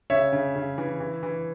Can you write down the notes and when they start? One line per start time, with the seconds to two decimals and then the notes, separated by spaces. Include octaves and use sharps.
0.10 C#3 C#5 E5
0.32 C#3
0.55 C#3
0.78 E3
1.00 E3
1.23 E3